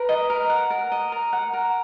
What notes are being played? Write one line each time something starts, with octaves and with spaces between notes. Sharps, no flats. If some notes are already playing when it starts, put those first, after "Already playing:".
Already playing: A#4 B4
D#5
A#4
F#5
A#4
D#5
A#4
F#5
A#4